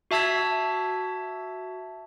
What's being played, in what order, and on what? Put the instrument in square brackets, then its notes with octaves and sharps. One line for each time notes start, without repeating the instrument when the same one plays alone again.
[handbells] F#4 E5 A5 E6 G#6 B6